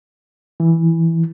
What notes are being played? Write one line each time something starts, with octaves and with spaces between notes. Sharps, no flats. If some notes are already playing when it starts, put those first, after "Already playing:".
E3